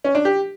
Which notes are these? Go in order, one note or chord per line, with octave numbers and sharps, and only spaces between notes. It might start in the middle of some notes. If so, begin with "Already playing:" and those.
C#4
D4
G4